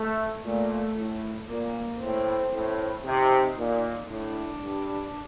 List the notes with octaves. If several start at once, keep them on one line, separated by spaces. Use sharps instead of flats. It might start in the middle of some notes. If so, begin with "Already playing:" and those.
Already playing: A3
A#2 A3
A2
A#2 A#3
A2 C4
A2
C3 D#4
A#2
A2 D4
G2